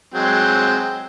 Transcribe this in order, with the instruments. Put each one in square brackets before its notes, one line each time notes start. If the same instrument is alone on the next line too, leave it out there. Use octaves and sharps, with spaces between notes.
[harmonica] F#3 G#3 C4